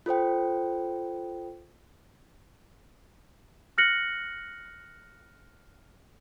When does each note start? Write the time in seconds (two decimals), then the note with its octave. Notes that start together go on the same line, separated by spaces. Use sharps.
0.06 F4 A4 C5 G5
3.78 F6 F#6 A#6 C#7 F#7